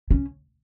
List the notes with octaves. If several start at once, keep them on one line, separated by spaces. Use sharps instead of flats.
C#4